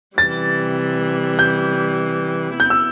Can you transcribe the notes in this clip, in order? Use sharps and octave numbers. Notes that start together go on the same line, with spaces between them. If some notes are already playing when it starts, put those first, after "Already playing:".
C3 E3 G3 A6
G6
B3 E4 G6
E6